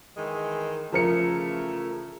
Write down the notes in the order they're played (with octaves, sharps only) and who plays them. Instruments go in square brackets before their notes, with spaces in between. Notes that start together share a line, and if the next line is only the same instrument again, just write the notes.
[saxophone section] D#3 E3 G#3
[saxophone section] C#3 E3 A3 [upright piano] F3 A#4 C#7